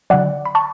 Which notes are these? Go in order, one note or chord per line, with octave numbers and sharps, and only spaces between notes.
D3 F#3 D5 F#5
B5
A5 C#6